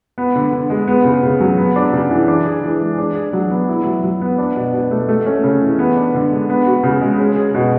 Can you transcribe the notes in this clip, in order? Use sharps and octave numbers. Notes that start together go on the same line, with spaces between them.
B3
D3
D3
G#3
B3
C#3
C#3
F#3
B3
D4
C#3
E3
D4
G#4
E3
G#3
D4
G#4
F#3
B3
E4
F#3
F#3
B3
D4
B2
B2
A3
A3
C#4
C#3
E3
B3
D4
D3
G#3
B3
F#4
C#3
G#3
C#4
G#4
B2